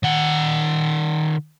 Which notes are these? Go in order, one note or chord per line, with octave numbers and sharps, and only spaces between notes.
D#3 F#5